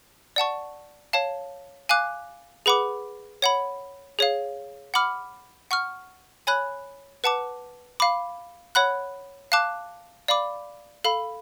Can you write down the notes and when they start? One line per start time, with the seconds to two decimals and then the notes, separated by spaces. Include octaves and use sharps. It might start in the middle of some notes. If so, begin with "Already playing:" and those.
0.36 D5 F#5 A5 C#6
1.13 C#5 F5 A5
1.89 F5 G#5 D6 F#6
2.66 G#4 B4 F#5 B5 D6
3.42 C#5 F#5 B5
4.19 G#4 C#5 F5
4.94 F#5 B5 D6 F6
5.71 F#5 C#6 F6
6.47 C#5 G#5 B5 F#6
7.24 B4 F#5 A5 D6
8.00 F5 B5 D6
8.75 C#5 F#5 B5 F#6
9.52 F5 A5 D6 F#6
10.28 D5 F5 B5 D6
11.04 A4 F5 B5